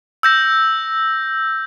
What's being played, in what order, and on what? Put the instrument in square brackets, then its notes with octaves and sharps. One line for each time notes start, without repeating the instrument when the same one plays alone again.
[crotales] E6 G6 A#6